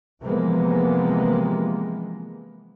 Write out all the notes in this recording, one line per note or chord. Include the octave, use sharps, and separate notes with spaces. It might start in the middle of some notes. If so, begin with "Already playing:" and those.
C3 E3 F3 G#3 A#3 B3